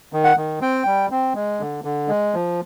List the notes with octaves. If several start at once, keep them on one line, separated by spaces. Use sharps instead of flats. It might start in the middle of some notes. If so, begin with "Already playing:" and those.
D#3
F#5
D#3
C4 G5
G3
C4
G#3
D3
D3
G#3
F3